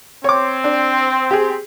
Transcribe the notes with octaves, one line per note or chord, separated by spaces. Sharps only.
C4 C#5 D6
D4
G4 G#4